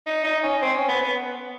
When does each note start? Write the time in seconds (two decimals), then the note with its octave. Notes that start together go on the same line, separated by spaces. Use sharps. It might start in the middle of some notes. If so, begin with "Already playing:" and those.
0.07 D#4
0.24 D#4
0.43 C#4
0.61 C4
0.74 C#4
0.88 B3
1.02 B3